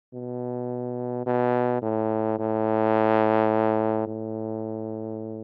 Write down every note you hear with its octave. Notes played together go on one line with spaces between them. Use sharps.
B2
B2
A2
A2
A2